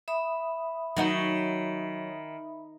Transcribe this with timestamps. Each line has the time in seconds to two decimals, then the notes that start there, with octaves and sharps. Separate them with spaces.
0.08 E5 B5 D#6
0.97 D#3 F#3 D#4 F#4